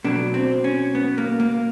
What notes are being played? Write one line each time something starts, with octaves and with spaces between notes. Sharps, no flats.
B2 F#3 D4
C4
C#4
B3
A#3
A#3